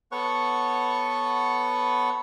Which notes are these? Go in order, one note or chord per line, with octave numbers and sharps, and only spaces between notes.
B3 A4 B4 C#5 F#5 C#6